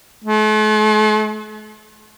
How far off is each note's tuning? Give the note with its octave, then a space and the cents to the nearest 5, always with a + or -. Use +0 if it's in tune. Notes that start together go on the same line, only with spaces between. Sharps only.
A3 -45